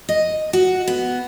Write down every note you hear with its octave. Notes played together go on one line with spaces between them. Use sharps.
D#5
F#4
B3